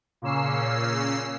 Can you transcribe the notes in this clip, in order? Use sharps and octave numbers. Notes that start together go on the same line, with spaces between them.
A#2 C#3 A#3 C#4 E6 C7